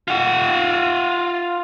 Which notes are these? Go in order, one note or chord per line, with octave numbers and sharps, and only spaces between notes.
F4 F#5